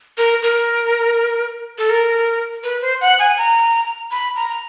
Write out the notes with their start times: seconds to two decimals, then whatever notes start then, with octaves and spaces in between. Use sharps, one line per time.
0.18 A#4
0.42 A#4
1.78 A4
1.90 A#4
2.64 B4
2.81 C5
3.01 F#5
3.19 G#5
3.38 A#5
4.11 B5
4.36 A#5